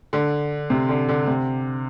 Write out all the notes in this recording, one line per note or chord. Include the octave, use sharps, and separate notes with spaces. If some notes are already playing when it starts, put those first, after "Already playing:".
D3
C3
D3
D3
C3